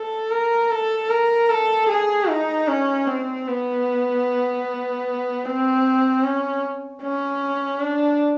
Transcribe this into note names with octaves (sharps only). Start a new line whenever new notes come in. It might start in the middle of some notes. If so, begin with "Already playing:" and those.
Already playing: A4
A#4
A4
A#4
A4
G#4
D#4
C#4
C4
B3
C4
C#4
C#4
D4